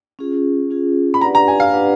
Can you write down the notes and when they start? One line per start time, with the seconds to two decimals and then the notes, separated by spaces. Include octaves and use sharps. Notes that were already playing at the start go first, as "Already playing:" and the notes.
0.19 C#4 F4 G#4
0.70 C#4 F4 G#4
1.14 B5
1.21 D4 G4 B4 D5 F#5 A#5
1.35 A#5
1.48 G#5
1.60 F5
1.72 D4 G4 B4 D5 F#5